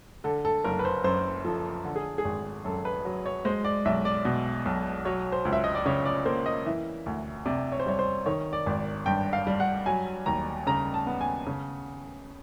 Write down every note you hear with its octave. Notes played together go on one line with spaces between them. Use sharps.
D3 A4
A4
F#1 A#4
B4
C5
F#2 C5
F3 A4
D3 A4
G#4
G#4
G#1
F#2 A4
B4
F#3
C#5
G#3 C5
D5
B1 E5
D5
B2
B1
F#3 C#5
C5
C#2
E5
D#5
D5
C#3 C#5
D5
A#3 C5
D#5
E3 E5
D2
C3 D5
C#5
C5
G3 C#5
C5
D#3 C#5
D5
G#1
G2 G5
F5
G3
F#5
F#3 G#5
D#2 A#5
C#3 A#5
A5
B3
G#5
C#3